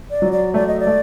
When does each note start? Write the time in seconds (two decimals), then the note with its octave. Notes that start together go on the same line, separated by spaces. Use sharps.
0.10 D5
0.22 F#3
0.32 D5
0.54 A3 D5
0.67 D#5
0.80 D5
0.87 A3